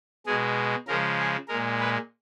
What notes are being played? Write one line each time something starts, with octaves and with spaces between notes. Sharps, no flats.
B2 G#3 G#4
C#3 F3 G#3 A#4
G#4
A#2 G#3 A#4
B4